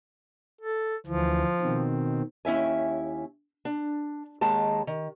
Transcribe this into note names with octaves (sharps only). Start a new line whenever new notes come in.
A4
D2 E3 F3
B2 D#3 C4
D#2 C#4 E4 E5 G#5
D4
D#2 D#3 G#3 A5
D#3